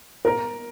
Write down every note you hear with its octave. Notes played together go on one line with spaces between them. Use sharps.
A#4